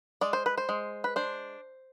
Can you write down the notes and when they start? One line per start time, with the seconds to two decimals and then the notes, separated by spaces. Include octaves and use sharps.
0.21 G#3 D5
0.33 C5
0.46 B4
0.58 C5
0.69 G#3
1.04 B4
1.16 D4 C5